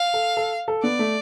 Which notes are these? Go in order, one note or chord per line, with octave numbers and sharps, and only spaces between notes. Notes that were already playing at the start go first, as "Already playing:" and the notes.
Already playing: F5
A4
A4
A4
B3 D5
A3